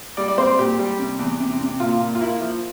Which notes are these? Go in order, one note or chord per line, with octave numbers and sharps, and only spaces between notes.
G3 D5
D5
C4 C5
A#2 G4
G3
C3
E2
C3
C3
A#2 F4
A#2
F4
A#3 E4
F3